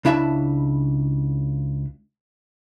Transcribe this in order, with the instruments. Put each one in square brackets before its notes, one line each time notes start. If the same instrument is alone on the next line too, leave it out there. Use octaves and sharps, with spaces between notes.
[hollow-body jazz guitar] C#2 D4 E4 E5 A5